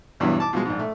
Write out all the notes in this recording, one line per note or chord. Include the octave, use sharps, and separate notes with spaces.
E2 G2 B2 E3 F#3
A5 D6
B2 F3 G#3
A#1 G#2
A3